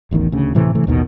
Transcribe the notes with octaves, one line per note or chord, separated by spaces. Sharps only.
D1 A1 E2 D#3
D2 C#3
A2 C3 E3 A3
C3 E3 A3
A1 D#2 B2 D#3